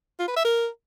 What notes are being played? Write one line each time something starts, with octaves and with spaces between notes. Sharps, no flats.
F4
B4
E5
A#4